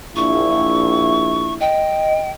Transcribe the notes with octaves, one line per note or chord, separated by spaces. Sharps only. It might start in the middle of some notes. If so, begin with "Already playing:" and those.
A#1 E4 C#6
D#5 G5